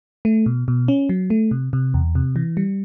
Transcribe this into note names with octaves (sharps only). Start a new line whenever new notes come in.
A3
B2
B2
C#4
F#3
A3
C3
C3
E2
C3
E3
G3